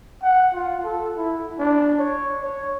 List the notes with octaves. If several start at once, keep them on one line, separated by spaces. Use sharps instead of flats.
F#5
F4
A4
E4
D4
C#5
C#5